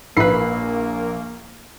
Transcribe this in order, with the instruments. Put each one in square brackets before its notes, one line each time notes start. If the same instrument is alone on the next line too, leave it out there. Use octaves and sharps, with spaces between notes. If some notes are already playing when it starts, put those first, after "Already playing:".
[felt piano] A#1 C7 [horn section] A#3 [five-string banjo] E4 B4